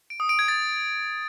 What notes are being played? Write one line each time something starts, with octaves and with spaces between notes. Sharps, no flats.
D7
D#6
D7
G#6
A6